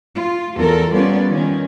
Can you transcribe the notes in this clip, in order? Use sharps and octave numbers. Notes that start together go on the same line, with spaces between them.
F4
E2 A4 A#4
G3 B3 C#4 F4 D5
D#3 C#4